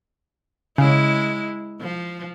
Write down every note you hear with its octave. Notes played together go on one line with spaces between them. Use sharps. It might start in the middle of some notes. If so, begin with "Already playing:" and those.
C#3 G#3 E4
F3